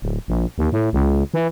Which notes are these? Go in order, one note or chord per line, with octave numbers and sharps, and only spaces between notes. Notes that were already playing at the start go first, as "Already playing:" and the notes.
D1
A#1
D#2
A2
C#2
E3